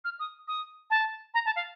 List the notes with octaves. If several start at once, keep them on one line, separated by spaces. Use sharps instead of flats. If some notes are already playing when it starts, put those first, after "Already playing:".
F6
D#6
D#6
A5
A#5
A5
F5